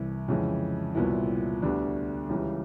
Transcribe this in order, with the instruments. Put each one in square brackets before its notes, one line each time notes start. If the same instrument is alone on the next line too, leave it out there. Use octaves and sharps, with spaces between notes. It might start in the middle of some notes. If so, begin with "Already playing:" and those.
Already playing: [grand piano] C2 C3 E3
F2 C#3 E3 G#3
C2 A#2 F#3 B3 E4
D2 D3 G3 B3 D4
C#2 C#3 E3 G3